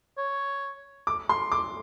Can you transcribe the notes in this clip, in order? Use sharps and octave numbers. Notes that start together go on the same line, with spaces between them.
C#5
D6
C6
D6